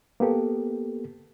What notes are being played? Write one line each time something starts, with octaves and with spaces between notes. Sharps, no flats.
A#3 B3 G4 A4